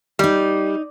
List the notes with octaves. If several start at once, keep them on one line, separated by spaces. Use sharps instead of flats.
G3 D#4 D#5